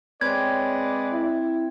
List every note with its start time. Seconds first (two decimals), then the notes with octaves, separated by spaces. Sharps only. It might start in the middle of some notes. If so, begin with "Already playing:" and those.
0.21 G#3 C4 B4 C#5 D5 G#6
1.12 E4